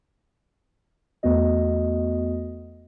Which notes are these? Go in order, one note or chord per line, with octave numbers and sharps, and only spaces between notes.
E2 A3 B3 F#4 D#5